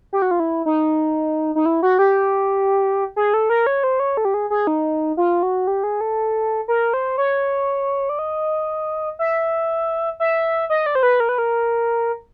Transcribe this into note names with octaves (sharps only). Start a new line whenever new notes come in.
G4
F#4
F4
E4
D#4
D#4
E4
F#4
G4
G#4
A4
A#4
C#5
C5
C#5
A4
G4
G#4
G#4
D#4
F4
F#4
G4
G#4
A4
A#4
C5
C#5
D5
D#5
E5
E5
D#5
D5
C5
B4
A#4
B4
A#4